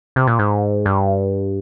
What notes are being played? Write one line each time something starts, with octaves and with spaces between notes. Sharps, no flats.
C3
A#2
G#2
G2